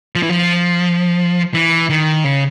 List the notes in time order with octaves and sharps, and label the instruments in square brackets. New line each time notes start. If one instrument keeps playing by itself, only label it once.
[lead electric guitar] F3
E3
F3
E3
D#3
C#3